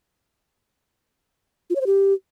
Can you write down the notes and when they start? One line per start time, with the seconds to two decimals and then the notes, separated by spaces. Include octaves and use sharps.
1.70 F4
1.76 C#5
1.81 C5
1.87 G4